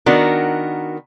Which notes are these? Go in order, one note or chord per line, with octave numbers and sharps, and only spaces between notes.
D#3 B3 D4 F#4 A#4